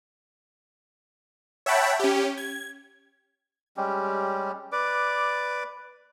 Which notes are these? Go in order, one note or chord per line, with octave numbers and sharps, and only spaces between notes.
C#5 E5 F#5 G5 A5 B5
C#4 G4
G#6
G3 G#3 C#4 G4
B4 D5 D6